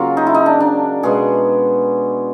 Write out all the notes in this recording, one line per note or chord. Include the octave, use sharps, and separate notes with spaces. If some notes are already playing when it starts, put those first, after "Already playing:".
Already playing: C#3 F#3 A#3 F4
D#4
E4
D#4
D4
D4
B2 G#3 B3 G#4